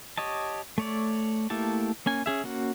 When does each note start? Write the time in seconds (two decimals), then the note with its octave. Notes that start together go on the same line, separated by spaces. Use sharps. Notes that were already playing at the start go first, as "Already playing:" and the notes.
0.18 G4 C#5 D#5 A5
0.78 A3 C#5 D5
1.50 A3 A#3 E4 G4 A5
2.06 A#3 C#4 G#5
2.26 C#4 G#4 E5
2.44 A#3 C#4 F#4